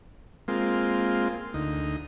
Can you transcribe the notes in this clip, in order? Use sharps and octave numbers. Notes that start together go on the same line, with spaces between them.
G#3 A#3 C4 F4
D2 D#4